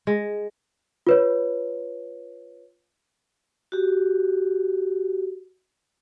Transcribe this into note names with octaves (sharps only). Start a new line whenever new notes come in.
G#3
F4 B4 C#5
F#4 G4